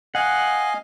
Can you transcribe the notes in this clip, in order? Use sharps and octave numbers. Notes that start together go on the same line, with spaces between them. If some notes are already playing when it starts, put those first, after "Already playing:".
D#5 F5 F#5 G#5